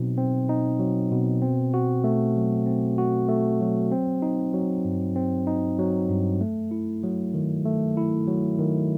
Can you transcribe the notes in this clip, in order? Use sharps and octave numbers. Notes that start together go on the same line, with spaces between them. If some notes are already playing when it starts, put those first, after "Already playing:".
Already playing: B2 F#3 C4 D#4
C4
D#4
F#3
B2
C4
F#4
A3
F#3
C4
F#4
A3
F#3
C4
D#4
F#3
G2
C4
D#4
F#3
G2
A3
E4
F#3
D#3
A3
E4
F#3
D#3